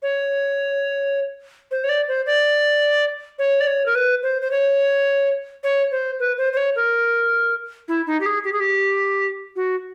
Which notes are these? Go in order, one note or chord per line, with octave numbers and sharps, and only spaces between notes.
C#5
C5
C#5
D5
C5
D5
C#5
D5
C#5
A#4
B4
C5
C5
C#5
C#5
C5
B4
C5
C5
C#5
A#4
E4
D#4
G4
G#4
G4
G#4
G4
F#4